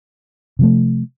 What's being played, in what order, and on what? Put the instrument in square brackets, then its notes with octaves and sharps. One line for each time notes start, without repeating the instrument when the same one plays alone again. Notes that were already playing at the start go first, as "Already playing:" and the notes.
[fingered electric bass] C3 F3 A3